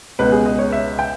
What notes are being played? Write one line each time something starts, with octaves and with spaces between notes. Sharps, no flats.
C#2 B2 B4
G#4
D#5
C#5
E5
G5